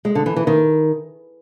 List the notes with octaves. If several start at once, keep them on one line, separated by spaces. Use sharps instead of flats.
G#3
D3
E3
E3
D#3